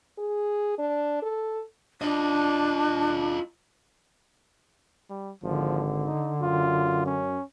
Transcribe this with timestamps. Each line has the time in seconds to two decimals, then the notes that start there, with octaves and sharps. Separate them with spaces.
0.18 G#4
0.78 D4
1.22 A4
2.02 D4 F4 D#5
5.10 G3
5.43 G#1 D3 F3
6.06 D#4
6.42 F#2 F4
7.06 C#4